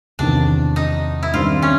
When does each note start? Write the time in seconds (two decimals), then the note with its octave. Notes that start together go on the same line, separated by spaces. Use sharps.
0.19 E2 C3 D#3 D4
0.76 D#4
1.23 E4
1.34 G2 D#3 G3 C4 F4
1.62 C#4